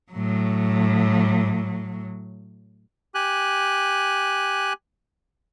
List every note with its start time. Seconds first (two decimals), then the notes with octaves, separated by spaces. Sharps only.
0.13 A2 F#3
3.15 G4 G#5 F#6